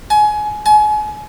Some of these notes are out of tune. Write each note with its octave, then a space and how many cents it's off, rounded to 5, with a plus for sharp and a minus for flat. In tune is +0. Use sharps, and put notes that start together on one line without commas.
G#5 +25
G#5 +35